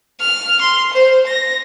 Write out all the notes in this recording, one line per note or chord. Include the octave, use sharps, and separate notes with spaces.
F6
C6
C5
A#6